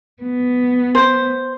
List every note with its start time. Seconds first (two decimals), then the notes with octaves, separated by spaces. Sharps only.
0.22 B3
0.95 C5